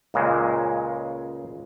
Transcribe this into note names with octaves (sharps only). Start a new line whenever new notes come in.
C#2 A#2 C#3 G#3